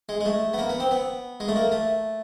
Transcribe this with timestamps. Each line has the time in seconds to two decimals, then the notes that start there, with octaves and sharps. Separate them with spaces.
0.09 G#3
0.20 G#3
0.26 A3
0.53 B3
0.58 A#3
0.69 B3
0.80 C4
0.91 B3
1.40 G#3
1.48 A3
1.56 A#3
1.72 A3